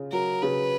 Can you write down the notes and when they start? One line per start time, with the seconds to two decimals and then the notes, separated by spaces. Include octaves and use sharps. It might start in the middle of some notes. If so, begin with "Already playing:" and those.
Already playing: C#3 F4
0.12 F#3 A#4
0.42 C#3 B4